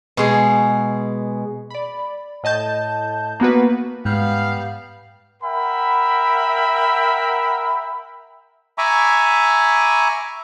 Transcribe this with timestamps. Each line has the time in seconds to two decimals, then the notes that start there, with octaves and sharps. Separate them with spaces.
0.17 B2 G#3 G#4
1.70 D5 B5
2.43 A2 D#5 A5 G6
3.40 A#3 B3 F#4 B4
4.05 G#2 G3 B3 F5
5.42 A#4 E5 F#5 G5 B5
8.78 E5 G#5 A#5 B5 C#6 D6